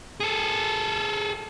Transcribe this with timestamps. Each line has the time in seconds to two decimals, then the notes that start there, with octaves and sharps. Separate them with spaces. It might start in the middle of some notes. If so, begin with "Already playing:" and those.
0.20 G#4 A4